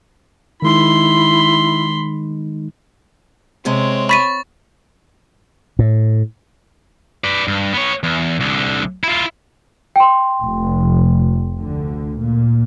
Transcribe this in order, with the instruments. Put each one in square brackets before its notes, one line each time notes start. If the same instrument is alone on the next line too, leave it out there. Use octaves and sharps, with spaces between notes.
[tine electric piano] D#3 G#3 D#4 [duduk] E4 [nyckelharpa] B5 C6
[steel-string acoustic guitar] C3 G#3 [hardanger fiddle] C4 C#5
[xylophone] B5 B6 D#7 [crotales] C#6 A6
[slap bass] A2
[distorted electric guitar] B4 D5
G2
B3 C#5
E2
C2 D3
E4 F4
[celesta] G5 C6
[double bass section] F1
D2 D3
A#2